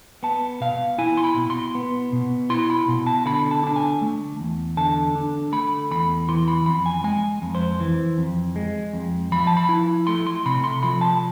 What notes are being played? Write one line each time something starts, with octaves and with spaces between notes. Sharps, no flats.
B3 A5
B2 F5
E4 G#5
C6
B5
B2
C6
B3
B2
E4 C6
B5
B2
A5
D3 B5
A5
D4 A5
G#5
A3
E2
D3 A5
D4
A3 B5
E2 B5
E3 C6
B5
F2 B5
G#5
G#3 G#5
F2
C5
E3
F2
G#3
F2
F3 B5
A5
B5
E4
A3 C6
C6
C3 B5
C6
F3 B5
A5